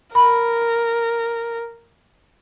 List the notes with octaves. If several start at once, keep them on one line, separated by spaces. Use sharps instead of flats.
A#4 B5